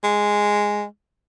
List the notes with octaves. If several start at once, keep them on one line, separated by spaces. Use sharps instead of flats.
G#3